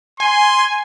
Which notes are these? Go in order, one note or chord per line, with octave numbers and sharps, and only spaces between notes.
G#5 C6